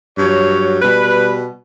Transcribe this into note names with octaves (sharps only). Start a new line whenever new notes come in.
G2 F#3 C#5
B2 G3 B4